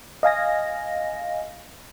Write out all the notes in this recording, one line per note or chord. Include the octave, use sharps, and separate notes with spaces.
D#5 F5 G#5 A#6